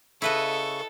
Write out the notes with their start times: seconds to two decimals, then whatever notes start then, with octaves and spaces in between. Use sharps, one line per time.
0.22 C#3 E4 A4 B4 D#5 C#6